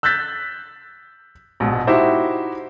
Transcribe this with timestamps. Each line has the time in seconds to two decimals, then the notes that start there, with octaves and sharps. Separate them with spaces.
0.03 E6 F#6 G6 A6 B6
1.60 A#1 G#2 B2
1.87 D#4 E4 F#4 G4 C5 E5